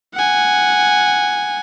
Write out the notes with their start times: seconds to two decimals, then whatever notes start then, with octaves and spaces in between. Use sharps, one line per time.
0.14 F#5 G#5